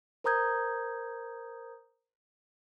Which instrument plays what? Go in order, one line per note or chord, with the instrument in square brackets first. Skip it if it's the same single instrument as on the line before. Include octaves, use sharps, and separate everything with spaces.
[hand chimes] A#4 C5 A#5 D#6 G6 G#6